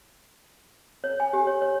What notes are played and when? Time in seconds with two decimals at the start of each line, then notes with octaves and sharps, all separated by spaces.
1.04 C#5
1.20 G#5
1.33 G4
1.47 C#5
1.62 C#5